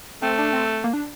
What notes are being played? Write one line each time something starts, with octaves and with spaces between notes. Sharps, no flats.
A3 C4
D4
C4
A#3
D4